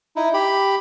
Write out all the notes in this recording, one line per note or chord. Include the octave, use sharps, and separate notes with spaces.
D#4 E4
G4 B5